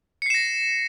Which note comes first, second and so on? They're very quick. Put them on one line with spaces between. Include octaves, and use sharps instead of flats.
C#7 C7 E7 A#6